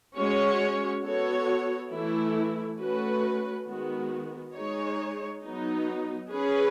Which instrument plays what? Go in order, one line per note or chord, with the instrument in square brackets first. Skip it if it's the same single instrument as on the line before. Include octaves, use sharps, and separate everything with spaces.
[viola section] G#3 C#4 F#4 C#5
B3 F#4 A4 C#5
E3 A3 E4
A3 C#4 F#4 B4
D#3 G#3 B3 F#4
G#3 D#4 G#4 C#5
F#3 B3 D#4
C#4 G#4 B4